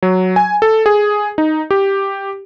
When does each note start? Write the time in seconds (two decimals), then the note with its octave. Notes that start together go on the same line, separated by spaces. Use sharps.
0.02 F#3
0.36 G#5
0.62 A4
0.86 G#4
1.38 D#4
1.71 G4